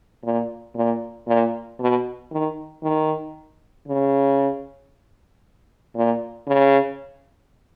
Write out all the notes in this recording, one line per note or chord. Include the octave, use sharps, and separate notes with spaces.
A#2
A#2
A#2
B2
D#3
D#3
C#3
A#2
C#3